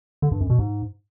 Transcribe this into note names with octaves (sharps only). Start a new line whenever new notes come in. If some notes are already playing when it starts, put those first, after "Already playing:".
D3
G2
F#2
B2
G#2